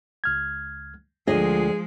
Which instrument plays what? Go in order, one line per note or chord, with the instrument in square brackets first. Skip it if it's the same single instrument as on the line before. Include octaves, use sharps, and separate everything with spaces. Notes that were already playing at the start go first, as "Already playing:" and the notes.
[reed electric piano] C#2 F6 G#6
[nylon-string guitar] D2 D#5 [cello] F3 G#3 [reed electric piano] F4 [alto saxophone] G#4